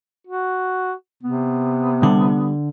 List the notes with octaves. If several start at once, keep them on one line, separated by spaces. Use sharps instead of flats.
F#4
C3 B3
D3 G3